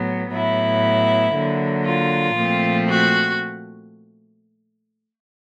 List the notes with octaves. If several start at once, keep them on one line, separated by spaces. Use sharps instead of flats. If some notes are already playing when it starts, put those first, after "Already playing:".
Already playing: A2 F#3 B3
A2 F#3 B3 E4
D3 F#3 A#3
F4
A#2 F3 A3 C4
F#4